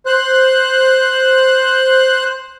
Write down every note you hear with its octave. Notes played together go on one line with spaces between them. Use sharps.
C5 F#6